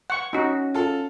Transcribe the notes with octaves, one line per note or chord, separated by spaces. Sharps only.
F#5 C#6
C#4 D#4 F#4
F4 A4